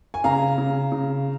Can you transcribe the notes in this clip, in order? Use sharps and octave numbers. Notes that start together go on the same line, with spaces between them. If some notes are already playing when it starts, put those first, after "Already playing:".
G#5
C#3 F5 A#5
C#3
C#3